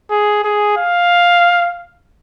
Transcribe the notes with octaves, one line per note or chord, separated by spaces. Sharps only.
G#4
G#4
F5